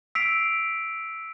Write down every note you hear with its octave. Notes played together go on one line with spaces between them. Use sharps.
E6 B6 C7 D7 F7